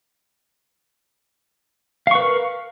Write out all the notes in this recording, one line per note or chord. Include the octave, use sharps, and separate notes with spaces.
A#4 B4 F5 C#6